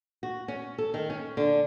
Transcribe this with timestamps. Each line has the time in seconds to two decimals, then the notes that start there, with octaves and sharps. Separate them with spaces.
0.23 F#4
0.48 C#4
0.78 A4
0.94 D#3
1.10 C#4
1.37 D3